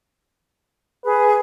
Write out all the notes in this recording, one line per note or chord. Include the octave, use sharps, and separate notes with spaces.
G#4 B4